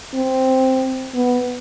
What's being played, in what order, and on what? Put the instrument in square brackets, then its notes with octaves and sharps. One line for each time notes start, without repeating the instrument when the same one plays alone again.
[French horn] C4
B3